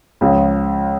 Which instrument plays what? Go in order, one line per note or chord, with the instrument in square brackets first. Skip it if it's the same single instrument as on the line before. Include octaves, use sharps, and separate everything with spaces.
[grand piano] C#2 C#3 F3